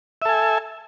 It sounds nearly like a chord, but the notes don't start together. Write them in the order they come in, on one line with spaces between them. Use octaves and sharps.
E5 A4 G#5